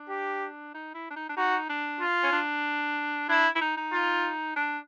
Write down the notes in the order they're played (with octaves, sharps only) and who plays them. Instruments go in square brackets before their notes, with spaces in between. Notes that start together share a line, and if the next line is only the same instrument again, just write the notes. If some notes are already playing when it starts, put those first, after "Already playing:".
Already playing: [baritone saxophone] D4
[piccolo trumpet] G4
[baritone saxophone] D#4
E4
D4
D#4
D4
[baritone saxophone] D#4 [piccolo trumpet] F#4
[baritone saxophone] D4
[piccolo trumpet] F4
[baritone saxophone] C#4
D4
[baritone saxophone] D4 [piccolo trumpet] E4
[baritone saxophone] E4
D#4
D#4
[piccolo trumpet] F4
[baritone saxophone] D4